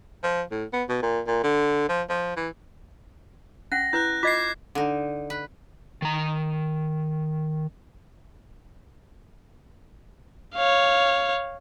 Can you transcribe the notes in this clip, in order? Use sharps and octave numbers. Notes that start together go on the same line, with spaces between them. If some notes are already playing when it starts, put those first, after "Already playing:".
F3
A2
B3
B2
A#2
A#2
D3
F3
F3
E3
C#4 F#5 A#6
E4 B4 F#6 G6
F4 D#5 D6 G#6 C7
D3 D#4
B4
D#3 A#5
C#5 F5